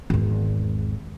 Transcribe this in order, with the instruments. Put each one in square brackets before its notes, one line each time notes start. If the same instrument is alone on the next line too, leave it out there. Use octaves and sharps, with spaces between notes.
[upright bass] G#1 E2